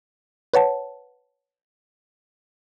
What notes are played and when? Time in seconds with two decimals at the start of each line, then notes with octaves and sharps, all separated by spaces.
0.54 B4 C#5 F#5 A5